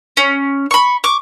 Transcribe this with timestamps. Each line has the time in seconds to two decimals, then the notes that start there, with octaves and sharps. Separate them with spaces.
0.17 C#4
0.71 B5 C#6
1.04 C#6 D6